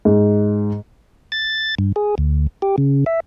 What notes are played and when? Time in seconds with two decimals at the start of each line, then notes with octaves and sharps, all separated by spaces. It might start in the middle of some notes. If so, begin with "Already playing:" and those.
0.05 G#2
1.32 A6
1.79 G2
1.96 G#4
2.18 D2
2.62 G4
2.78 C#3
3.06 E5